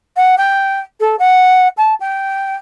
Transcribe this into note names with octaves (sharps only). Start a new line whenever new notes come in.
F#5
G5
A4
F#5
A5
G5